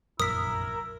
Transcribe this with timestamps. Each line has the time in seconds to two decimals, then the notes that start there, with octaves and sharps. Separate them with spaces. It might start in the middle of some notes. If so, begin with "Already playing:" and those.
0.20 F1 A#1 F#2 E4 A#4 D#6 B6